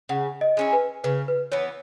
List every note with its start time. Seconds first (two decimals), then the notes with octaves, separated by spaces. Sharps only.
0.09 C#3 F#5
0.41 D#5
0.57 G#3 C#4 E4
0.73 B4
1.04 C#3 B4
1.28 B4
1.52 E3 B3 C#5